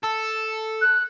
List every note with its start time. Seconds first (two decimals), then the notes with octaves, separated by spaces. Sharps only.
0.03 A4
0.81 F#6